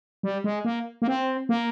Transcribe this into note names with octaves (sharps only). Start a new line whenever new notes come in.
G3
G#3
A#3
A#3
C4
A#3